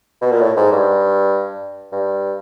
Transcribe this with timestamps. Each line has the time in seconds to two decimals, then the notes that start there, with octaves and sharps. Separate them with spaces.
0.21 B2
0.31 A#2
0.41 A2
0.56 G#2
0.72 G2
1.92 G2